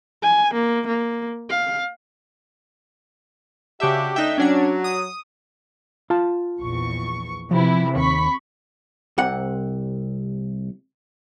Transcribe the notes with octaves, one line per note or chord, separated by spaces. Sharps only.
G#5
A#3
A#3
F5
C#3 D4 F#4 G4 E5
A3 D4 D#4 E5 G5
F#3 C#4 D4 G#6
D#6
F4 A5
A#1 E2 C#6
C3 E3 F3 E4
D#2 B5 C#6 B6
C2 C3 F#5